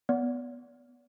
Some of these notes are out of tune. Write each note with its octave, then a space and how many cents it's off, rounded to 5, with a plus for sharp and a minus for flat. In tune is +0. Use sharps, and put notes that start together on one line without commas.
B3 +0 D5 -40